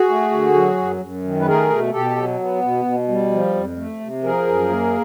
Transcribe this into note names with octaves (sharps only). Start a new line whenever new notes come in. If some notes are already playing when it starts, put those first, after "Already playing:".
Already playing: F#4 G#4
A3
D3
F#3
F#2
F#2
D#3
B4
A3 G#4 A#4
B2
B2 G4 A4
F#3
B3
B2
B2
G3
F3
F2
A3
C3
F3 G#4 A#4
F#2
A#3